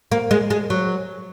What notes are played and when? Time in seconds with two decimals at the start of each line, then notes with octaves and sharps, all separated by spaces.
0.12 A#3
0.31 G#3
0.50 G#3
0.70 F#3